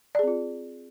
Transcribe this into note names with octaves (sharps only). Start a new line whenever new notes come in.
C4 F4 G#4 D5